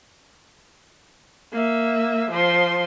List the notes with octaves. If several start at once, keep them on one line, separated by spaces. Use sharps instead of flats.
A#3 E5
F3 C6